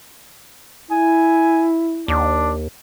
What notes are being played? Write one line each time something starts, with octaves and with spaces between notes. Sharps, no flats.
E4 G#5
D#2 D4